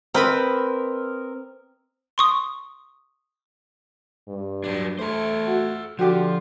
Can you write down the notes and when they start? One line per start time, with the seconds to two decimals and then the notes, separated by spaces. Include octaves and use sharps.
0.14 C4 A#4 B4 D#5 B5 E6
2.18 C6 C#6 D#6
4.28 G2
4.64 F#3 D4
4.99 A3 A4 C5
5.47 F#4
5.99 D3 F3 F#4 G4